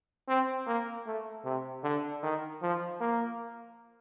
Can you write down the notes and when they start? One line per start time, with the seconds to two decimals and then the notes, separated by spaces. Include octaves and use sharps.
0.28 C4
0.67 A#3
1.06 A3
1.44 C3
1.83 D3
2.23 D#3
2.62 F3
3.01 A#3